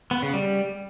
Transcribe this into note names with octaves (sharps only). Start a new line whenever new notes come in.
B3
C#3
G3